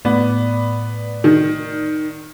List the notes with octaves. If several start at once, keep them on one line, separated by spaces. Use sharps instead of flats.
A2 B3 D5
D#3